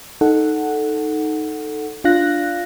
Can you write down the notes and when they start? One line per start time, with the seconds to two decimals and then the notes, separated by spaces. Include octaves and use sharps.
0.21 D#4 A4 F#5
2.04 D4 F4 F5 F#6 A#6